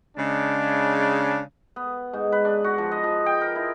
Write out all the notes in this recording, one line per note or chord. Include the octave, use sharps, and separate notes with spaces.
C#3 G#3 D4
B3
G#2
B4
D4
F#4
F3
D#5
F3
G5
A#4
E4